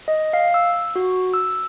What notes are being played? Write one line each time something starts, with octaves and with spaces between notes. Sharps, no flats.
D#5
F5
E6
F#4
E6